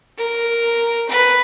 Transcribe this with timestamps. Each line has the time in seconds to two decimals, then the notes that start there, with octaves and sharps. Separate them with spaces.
0.18 A#4
1.09 B4